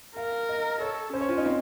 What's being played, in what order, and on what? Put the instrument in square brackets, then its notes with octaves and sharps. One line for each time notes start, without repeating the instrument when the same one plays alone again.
[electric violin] A#4 [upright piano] F5
[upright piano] D#5
[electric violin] A4 [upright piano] C#5
[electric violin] C#4 [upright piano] C5
[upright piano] C#5
F4
D#4
C4